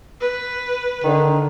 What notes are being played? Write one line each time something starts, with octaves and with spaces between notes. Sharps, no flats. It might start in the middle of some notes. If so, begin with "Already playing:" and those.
B4
D3 D#3